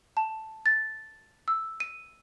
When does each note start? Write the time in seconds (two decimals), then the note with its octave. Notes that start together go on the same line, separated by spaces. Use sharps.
0.17 A5
0.66 A6
1.48 E6
1.80 D#7